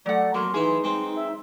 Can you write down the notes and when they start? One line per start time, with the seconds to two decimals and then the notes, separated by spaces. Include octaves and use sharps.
0.06 F#3 A3 D5 F#5
0.34 F2 F#3 A#3 C6
0.54 E3 D#4 E4 G#4
0.84 G#3 C4
1.16 E5